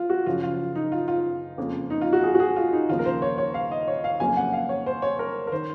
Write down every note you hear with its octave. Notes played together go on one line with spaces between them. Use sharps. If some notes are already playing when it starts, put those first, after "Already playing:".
Already playing: F4
F#4
F#1 F#2 F3 F4
F4
D#4
F4
F4
F2 C#3 F3 A#3
D#4
F4
F#4
G#4
F#4
G#4
F4
D#4
D#2 C#3 F3 A#3 F4
A#4
C5
C#5
C#5
F5
D#5
C#5
F5
F2 C#3 F#3 A#3 G#5
F#5
F5
C#5
C5
C#5
A#4
A#4
D#3 C5